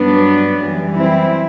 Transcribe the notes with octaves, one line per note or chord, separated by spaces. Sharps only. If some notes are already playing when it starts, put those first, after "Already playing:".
Already playing: G2 F#3 B3 D4
F#2 E3 G3
C4 E4